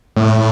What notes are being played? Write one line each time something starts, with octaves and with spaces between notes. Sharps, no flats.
A2